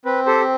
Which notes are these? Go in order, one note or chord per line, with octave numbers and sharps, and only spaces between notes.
C4 B4
G4 A4 C5